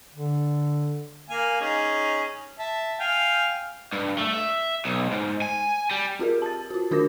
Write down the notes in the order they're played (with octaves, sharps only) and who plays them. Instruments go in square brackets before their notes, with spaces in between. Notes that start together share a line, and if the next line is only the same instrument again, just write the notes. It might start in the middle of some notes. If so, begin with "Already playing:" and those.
[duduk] D3
[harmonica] A#3 F5 G#5
C#4 D#4 G#4
E5 A5
F5 G5 G#5
[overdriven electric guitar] G2
A3
E5
B1
G#2
G#5
G3
[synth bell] C4 F4 G4 G#4 A#4
A5 A6
F4 F#4
D#3 D4 F#4 A#4 D6 A#6